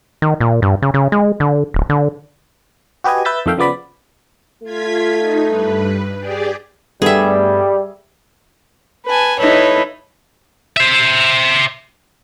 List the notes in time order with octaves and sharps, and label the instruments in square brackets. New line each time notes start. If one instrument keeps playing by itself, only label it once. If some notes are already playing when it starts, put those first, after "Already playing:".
[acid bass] D#3
A#2
G2
C#3
C#3
G#3
D3
D1
D3
[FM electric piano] F#4 G4 B4 D#5 G#5
B4 E5 E6 G6 A6 B6
F2 D#3 A3 E5 F5 G5
C#3 F3 B3 D5 B5
[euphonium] A3 [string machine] F4 G#6 B6
[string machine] D#4
G2 B4
G4 G#4 D5
[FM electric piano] G2 A3 B3 [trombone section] G3 [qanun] G#4 E5
[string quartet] B4 G#5 A5
D#4 E4 A4 B4 C#5
[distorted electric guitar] C5 E5